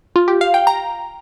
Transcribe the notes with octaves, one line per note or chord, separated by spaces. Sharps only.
F4
G4
F5
G5
A#5